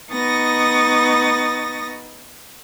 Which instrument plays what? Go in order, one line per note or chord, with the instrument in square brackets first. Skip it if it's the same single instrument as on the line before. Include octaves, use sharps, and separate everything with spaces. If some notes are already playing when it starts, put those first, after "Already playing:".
[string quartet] B3 D#4 C#6 D#6 A6 A#6